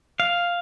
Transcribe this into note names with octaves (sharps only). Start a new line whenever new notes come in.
F5